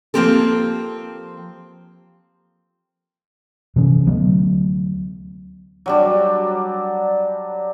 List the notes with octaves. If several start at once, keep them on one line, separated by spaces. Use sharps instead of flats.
F3 G3 A#3 C4 G4 A4
C3 E3 C#4
D2 F#3 B3
F#3 G3 D4